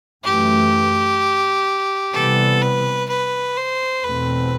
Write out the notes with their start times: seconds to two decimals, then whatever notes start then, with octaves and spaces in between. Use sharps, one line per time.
0.24 F#2 E3 A3 G4
2.14 C3 E3 G3 B3 A4
2.62 B4
3.09 B4
3.57 C5
4.03 E2 B2 A3 C4 B4